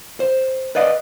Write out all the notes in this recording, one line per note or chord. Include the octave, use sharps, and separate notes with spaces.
C5
B4 D5 D#5 F5